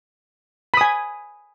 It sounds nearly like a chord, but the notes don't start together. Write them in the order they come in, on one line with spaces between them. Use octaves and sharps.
B5 D#6 G#5